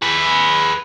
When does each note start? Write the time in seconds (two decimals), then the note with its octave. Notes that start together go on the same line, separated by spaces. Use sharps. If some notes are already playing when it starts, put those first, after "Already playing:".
0.02 G#4 B4